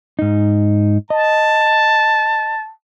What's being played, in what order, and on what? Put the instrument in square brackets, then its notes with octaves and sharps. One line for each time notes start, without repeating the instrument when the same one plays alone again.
[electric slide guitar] G#2 D#4
[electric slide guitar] D#5 [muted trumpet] A5